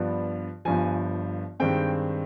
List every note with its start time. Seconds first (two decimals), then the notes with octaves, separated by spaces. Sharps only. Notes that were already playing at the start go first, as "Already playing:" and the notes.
Already playing: G2 F3 B3 D4
0.65 G1 G2 F3 G#5
1.60 G2 D#3 G#3 C4 G5